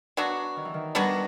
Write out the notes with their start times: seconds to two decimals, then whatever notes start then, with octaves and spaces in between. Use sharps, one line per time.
0.17 F#3 B3 D4 F#4
0.56 D#3
0.65 E3
0.74 D#3
0.95 F#3 G3 B3 D4 F#4